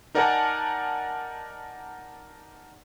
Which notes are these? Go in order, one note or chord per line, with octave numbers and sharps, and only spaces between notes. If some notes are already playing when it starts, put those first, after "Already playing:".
D#4 A#4 D5 F#5 G#5 A5